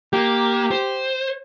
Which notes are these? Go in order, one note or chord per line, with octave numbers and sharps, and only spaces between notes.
A#3 G4
C5